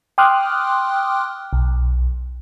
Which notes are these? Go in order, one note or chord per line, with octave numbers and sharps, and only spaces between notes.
G5 C6 D6 D#6 F6 F#6
B1